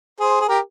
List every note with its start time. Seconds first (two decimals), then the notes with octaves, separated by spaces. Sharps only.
0.20 G#4 C5
0.41 G#4
0.48 G4 A#4